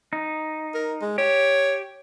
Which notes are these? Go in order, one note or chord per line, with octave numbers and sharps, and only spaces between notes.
D#4
A#4
G#3
G4 C#5